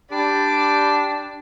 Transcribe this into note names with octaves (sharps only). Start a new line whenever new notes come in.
D4 G4 D5 B5 D6